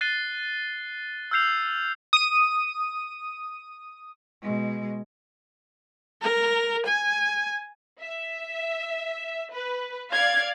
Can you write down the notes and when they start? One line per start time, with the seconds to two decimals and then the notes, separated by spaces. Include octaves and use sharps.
0.01 F#6 A6 C7 D#7 G7
1.31 E6 F6 G6 C7 F7
2.13 D#6 D#7
4.42 B2 G#3
6.22 A#4
6.85 G#5
8.00 E5
9.52 B4
10.12 D5 F5 G#6